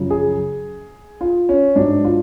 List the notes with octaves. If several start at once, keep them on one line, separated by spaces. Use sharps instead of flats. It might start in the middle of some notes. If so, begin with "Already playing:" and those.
Already playing: F#2 C#3 F3
G#4
F4
C#4
G#2 F#3 D4
F4